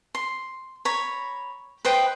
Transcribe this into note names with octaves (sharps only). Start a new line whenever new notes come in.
C6
C#5 A#5 B5
B4 C5 D#5 G5